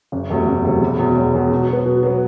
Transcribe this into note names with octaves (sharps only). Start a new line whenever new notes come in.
F#1
E2 C3 F#3 A3
F#1
E2 C3 F#3 A3
E1
E2 B2
E1
E2 B2
B2
F#3 B3
B2
F#3 B3